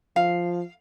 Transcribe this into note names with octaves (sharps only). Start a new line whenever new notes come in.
F3 F5